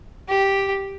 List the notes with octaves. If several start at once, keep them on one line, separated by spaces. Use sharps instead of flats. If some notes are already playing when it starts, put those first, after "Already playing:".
G4